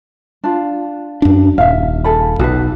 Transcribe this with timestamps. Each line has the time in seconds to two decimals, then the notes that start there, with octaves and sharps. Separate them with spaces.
0.44 D4 F4
1.22 F#2 D4
1.58 D#1 E5 F5
2.04 G#4 A4 B5
2.39 B1 F#4 B4